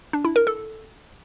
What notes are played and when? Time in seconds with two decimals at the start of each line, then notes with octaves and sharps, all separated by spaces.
0.13 D4
0.25 E4
0.36 A#4
0.47 A4